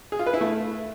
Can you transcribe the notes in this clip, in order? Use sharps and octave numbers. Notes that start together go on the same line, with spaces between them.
G#4
F4
B4
E4
A3